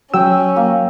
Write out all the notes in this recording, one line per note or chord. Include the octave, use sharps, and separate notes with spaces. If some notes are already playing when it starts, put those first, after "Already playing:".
F#3 C#4 G5 E6
A#3